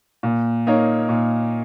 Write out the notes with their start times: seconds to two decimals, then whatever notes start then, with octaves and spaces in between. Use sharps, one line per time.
0.23 A#2
0.67 A#3 D#4 A#4 C#5
1.09 A#2